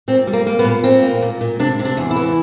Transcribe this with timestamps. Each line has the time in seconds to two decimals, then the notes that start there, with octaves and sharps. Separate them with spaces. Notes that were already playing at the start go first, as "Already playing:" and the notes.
0.08 A#2 C4
0.27 G3
0.33 A#3
0.47 A#3
0.59 B3
0.64 A#2
0.83 A#2 C4
1.03 A#3
1.22 A#2
1.41 A#2
1.59 C3 D4
1.79 C3
1.85 D4
1.97 E2
2.11 E4
2.16 E3